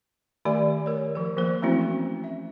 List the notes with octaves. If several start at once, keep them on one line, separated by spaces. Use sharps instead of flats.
D#3 A3 G4 D5 G#5
A#4 C#5
F3 A#4
F3 A#3 C5
E3 A3 C4 C#4 E4 F#4
E5